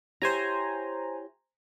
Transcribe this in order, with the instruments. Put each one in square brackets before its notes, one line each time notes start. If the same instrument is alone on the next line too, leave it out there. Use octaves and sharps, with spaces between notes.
[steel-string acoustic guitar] E4 G4 C#5 [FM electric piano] C5 G#5 A#5